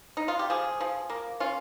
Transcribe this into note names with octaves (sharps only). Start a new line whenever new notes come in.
D#4
F4
G4
F3 G#4
F3
A#3
C#4 F4